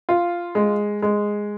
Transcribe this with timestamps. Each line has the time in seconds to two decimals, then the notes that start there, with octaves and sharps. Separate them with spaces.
0.09 F4
0.55 G#3
1.02 G#3